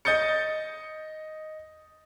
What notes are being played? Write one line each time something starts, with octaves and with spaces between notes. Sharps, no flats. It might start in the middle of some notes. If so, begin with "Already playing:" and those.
D#5 D#6 G6 A6 C#7